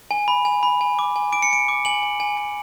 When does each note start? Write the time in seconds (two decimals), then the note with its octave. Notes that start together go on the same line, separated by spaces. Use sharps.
0.11 G#5
0.28 B5
0.45 G#5
0.63 B5
0.81 G#5
0.99 D6
1.16 G#5
1.32 D6 D7
1.42 C#7
1.51 G#5 D7
1.68 D6
1.85 G#5 F#7
2.03 G#5
2.20 G#5
2.37 G#5